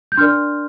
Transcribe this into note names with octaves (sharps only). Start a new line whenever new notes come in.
G6
D4 A#4 D5 C6 F6